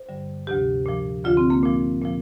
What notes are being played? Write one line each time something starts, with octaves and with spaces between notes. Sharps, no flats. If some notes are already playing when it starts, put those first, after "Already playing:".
Already playing: C5
G2 D3 G3
D2 C3 F3 G4
A#2 F3
D2 D3 F3 F4
C4
A#3
A#2 F3
A#2 F3